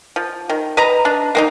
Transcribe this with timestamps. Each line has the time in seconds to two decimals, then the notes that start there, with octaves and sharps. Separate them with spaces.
0.16 F3
0.50 D#3
0.77 B4 D#5 A#5
1.05 D4
1.35 A#3 C4 D#4